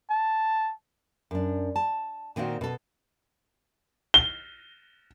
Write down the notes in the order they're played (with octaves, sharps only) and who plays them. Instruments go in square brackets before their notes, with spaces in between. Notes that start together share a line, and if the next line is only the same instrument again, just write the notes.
[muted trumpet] A5
[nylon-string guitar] F#2 D4
A5
A#2 D#3 C4 F#4 F5
B2 A4
[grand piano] G7